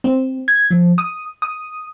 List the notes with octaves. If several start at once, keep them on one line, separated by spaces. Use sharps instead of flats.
C4
G#6
F3
D#6
D#6